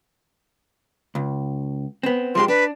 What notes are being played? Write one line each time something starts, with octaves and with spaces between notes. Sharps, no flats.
C#2
B3 C4
F3 G#3 G4 C6
D4 B4